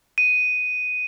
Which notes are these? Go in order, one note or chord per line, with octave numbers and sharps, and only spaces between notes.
D#7